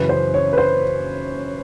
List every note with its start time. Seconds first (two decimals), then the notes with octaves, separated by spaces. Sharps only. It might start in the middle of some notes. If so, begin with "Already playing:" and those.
Already playing: F#2 C#3 E3 B4
0.09 C5
0.34 C#5
0.53 B4
0.58 C5